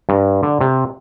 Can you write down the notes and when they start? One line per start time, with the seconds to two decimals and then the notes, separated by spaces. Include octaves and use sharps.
0.09 G2
0.43 D3
0.61 C3